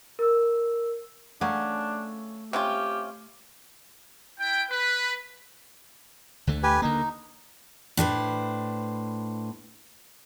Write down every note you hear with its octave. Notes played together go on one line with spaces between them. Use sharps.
A#4 E6
C#3 F#3 A3 C#4 D4
C3 C#4 F4 G4
E4 G5
B4
D2 D3 A3
G4 B4 G#5
D3 A#3 D#4
A2 D4 B4 C5